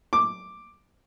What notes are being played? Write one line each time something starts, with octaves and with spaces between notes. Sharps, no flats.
D6